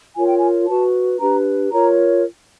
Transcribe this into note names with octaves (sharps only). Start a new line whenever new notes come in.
F4 A#4 C#5 G#5
G5
G#5
F#4 B4 A5
D4 G4 B4 A#5
F4 A#4 C#5 A#5